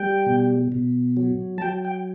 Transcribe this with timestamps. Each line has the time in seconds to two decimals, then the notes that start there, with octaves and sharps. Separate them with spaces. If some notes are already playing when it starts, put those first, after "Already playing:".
Already playing: G3 G5
0.26 B2
0.72 B2
1.17 F#3
1.58 A5
1.62 F#3 G5
1.85 G5